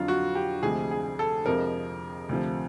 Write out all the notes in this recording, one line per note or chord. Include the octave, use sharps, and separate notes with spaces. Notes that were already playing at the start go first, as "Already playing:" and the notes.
Already playing: F2 D3 F#3 F4
F#4
G4
D2 C3 F3 G#3 G#4
G#4
A4
F2 C3 F3 G#3 A#4
D2 C3 F3